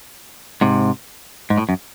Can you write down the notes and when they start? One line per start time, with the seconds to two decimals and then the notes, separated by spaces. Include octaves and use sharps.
0.61 G#2 C3
1.50 G#2
1.58 A2
1.69 F#2